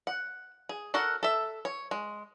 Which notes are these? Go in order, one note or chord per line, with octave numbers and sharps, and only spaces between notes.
F#5
G#4
F#4 A4 A#4 F#5
A4 E5
C#5
G#3